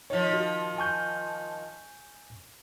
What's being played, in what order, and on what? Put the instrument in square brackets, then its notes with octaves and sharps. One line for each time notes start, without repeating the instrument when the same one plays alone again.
[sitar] D#3 F3 [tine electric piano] C#5
[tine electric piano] F#4
G#5 C#6 G6